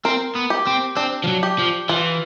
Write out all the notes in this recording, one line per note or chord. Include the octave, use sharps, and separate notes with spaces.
C4 A#4
B3
G4
C4
C4 D4
F3
F#3
G4
F3
E3 F4